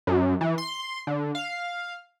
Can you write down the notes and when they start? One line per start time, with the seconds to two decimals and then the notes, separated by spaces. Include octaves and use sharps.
0.07 F#2
0.41 E3
0.58 C6
1.07 D3
1.35 F5